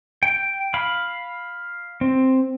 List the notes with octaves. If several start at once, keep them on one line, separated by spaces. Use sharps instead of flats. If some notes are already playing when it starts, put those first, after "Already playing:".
G5
F5 B5
C4